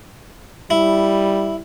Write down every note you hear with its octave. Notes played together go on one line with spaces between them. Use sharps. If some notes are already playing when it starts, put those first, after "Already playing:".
G3 E4